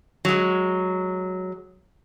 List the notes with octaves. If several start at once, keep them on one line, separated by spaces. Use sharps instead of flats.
F#3 G#3